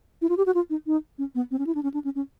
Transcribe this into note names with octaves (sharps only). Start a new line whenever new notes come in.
E4
F4
G4
F#4
F4
D#4
D#4
C#4
B3
C4
C#4
E4
D4
C#4
D4
C#4
C#4